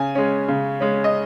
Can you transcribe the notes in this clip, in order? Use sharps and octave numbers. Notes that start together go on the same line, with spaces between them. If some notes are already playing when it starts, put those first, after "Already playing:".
Already playing: C#3 G#5
G#3 C#4
C#3
G#3 C#4
D#5